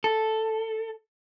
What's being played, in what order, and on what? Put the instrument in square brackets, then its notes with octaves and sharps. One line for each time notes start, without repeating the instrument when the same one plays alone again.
[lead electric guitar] A4